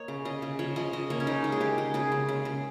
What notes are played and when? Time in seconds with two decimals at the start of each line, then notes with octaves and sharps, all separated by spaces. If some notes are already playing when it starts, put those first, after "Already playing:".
Already playing: A#3 C#5 D#5
0.08 C#3
0.25 C#3 D#5
0.42 C#3
0.59 F3 C#5
0.76 F3 D#5
0.93 C#3 D#5
1.10 A#3 C#5
1.20 C#4
1.27 C#3 D#4
1.44 G#3
1.52 G#4
1.60 C#3 G4
1.78 G#3
1.94 C#3 G#4
2.12 C#3
2.29 C#3
2.45 C#3